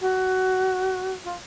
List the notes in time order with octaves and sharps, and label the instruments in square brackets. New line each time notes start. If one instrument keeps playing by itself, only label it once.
[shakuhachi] F#4
F4